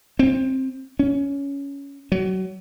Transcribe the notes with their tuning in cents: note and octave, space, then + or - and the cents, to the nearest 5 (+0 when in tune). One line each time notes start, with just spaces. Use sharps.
C4 +10
C#4 +15
F#3 +25